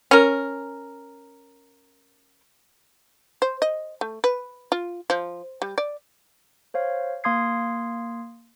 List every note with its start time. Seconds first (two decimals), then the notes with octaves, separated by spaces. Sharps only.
0.11 C#4 A#4
3.42 C5
3.62 D#5
4.01 A3
4.24 B4
4.72 F4
5.10 F3
5.62 G3
5.78 D5
6.74 C5 C#5 F5
7.24 A#3 F5 C6 D#6 G#6 C7